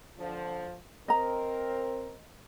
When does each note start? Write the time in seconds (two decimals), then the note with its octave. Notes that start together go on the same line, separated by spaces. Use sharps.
0.19 D3 F3
1.08 C4 A#4 D#5 A#5